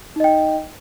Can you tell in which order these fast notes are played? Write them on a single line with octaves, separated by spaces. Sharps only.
D#4 D#5 G5